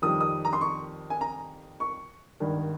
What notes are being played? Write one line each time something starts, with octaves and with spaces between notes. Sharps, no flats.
F2 D#3 G3 D#6
D#6
A#5
C6
C#6
G#5
A#5
C#6
G#1 G2 D#3